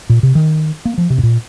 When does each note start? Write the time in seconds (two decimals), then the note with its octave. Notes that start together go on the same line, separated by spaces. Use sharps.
0.10 A#2
0.23 C3
0.35 D#3
0.85 A#3
0.98 F3
1.10 C3
1.18 G2
1.23 A#2